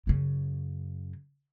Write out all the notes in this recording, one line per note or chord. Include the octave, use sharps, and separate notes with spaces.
F#2 C#3